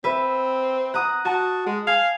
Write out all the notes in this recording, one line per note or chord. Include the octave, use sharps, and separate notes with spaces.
C4 B4 E5
F#5 A#5 D#6
F#4 A5
G#3
F5 G#5